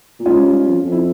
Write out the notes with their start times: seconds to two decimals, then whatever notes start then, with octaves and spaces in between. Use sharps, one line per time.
0.20 A#2
0.26 G#2 C#4 F4
0.43 G2
0.53 G#2
0.59 G2
0.67 F2
0.83 F2
0.92 E4